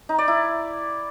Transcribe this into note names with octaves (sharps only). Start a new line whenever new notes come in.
D#4
D5
E4